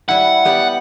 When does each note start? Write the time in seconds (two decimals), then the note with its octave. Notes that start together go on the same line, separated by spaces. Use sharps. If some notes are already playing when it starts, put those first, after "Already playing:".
0.09 G3 E4 F#5
0.45 B3 G4 D5